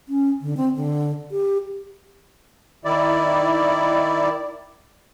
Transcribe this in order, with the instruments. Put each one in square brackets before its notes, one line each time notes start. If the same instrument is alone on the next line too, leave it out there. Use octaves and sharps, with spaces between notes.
[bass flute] C#4
D3
C4
D3
G4
[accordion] D#3 E4 D5